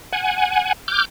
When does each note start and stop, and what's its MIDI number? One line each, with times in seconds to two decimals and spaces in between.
0.13 0.73 78
0.13 0.73 80
0.88 1.05 86
0.88 1.05 89
0.88 1.05 91